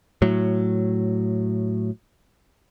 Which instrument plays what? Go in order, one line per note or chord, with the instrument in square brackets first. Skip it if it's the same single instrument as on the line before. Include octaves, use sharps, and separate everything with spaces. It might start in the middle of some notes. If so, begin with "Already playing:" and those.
[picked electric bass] A2 F#3